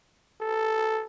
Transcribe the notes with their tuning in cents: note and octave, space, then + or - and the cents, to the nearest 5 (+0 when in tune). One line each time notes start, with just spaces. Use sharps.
A4 +0